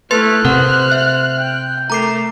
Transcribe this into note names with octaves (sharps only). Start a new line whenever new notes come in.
A3 E4 B4 C6 F6 F#6 A6
C3 A#4 C5 F#5
E5
G5
A3 A#4 A#5 D6 C7